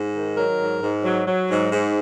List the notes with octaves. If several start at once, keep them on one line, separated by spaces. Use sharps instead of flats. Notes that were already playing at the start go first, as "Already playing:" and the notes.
Already playing: G#2
D#3
F#3 A#4
G#2
G#2
F#3
F#3
G#2
G#2